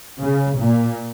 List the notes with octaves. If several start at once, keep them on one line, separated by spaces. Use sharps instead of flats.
C#3
A#2